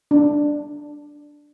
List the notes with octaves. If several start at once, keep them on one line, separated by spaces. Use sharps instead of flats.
D4